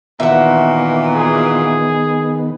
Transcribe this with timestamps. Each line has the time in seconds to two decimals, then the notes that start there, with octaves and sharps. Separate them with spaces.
0.20 A#2 D#3 E3 B3 F#4 E5
1.15 G#4